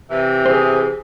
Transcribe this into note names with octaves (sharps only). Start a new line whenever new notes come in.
C3 E3
G#4 C5